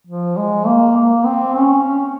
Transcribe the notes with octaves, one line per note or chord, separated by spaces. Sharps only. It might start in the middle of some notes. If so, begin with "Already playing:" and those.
F3
G#3
A#3
A#3
C4
C#4
C#4